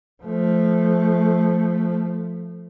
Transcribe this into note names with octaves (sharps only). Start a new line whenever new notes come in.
F3 A3